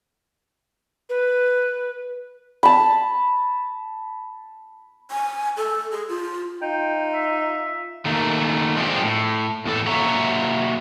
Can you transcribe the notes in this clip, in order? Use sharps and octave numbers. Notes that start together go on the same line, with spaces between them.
B4
A5 B5
G#5
A4
G#4
F4
D#4 F4 G5
E5
D#3 A3 A#3
F3 G#3 C4 D4 E4 G4
A2
E2 A2 A4
F#3 A#3 C#5 E5 A#5